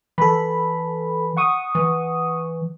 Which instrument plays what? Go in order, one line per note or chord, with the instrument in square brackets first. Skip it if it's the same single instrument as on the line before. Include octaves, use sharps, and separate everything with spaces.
[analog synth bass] E3 [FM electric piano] A4 B5
[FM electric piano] F#5 C#6 D#6
[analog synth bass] E3